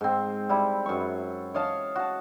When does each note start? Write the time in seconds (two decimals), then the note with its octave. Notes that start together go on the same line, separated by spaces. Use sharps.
0.01 G#2 C4
0.49 G3 E4
0.86 F#2 C#6
1.54 C#5 D#5 F5 A5
1.96 F#4 A5